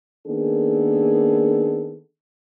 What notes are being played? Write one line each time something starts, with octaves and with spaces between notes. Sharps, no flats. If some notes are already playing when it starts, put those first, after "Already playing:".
D#3 A#3 B3 D4 G#4 A4